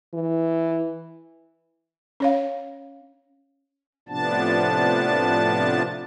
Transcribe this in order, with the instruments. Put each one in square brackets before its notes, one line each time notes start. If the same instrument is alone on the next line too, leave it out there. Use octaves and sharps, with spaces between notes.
[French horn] E3
[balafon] C#4 C#5 F5
[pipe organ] A2 C3 F3 B3 D4 A5